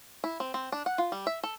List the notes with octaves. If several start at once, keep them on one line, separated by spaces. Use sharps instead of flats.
E4
C4
C4
D4
F#5
F4
G3
E5
A4